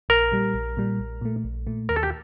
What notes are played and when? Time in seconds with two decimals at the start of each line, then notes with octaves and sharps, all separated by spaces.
0.09 A#1 A#4
0.32 A#2 G3
0.54 A#1
0.77 A#2 G3
0.99 A#1
1.21 A#2 A3
1.44 A#1
1.67 A#2 A3
1.89 D#2 A#4
1.96 A4
2.03 G4